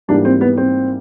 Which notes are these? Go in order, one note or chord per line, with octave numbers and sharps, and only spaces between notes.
G#2 E3 G3 A#3 D4
C4
B3
C4